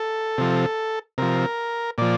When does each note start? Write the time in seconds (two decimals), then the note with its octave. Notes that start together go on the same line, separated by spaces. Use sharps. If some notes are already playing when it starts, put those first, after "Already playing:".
Already playing: A4
0.38 C3 F3
1.18 C3 F3 A#4
1.98 A#2 F3 D5